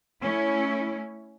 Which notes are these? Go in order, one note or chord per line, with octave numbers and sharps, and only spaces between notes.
A3 C#4 E4